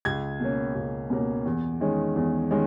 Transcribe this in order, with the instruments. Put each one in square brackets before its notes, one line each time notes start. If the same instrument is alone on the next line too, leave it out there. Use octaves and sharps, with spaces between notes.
[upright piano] C#2 G#6
B2 A#3 C#4
C#2
B2 A#3 C#4
E2
D#3 G#3 C#4
E2
D#3 G#3 C#4